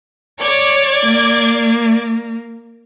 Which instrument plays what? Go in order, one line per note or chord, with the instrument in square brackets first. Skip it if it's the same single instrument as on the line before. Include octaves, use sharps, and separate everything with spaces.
[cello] C#5 [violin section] D5 D6 G#6
[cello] A#3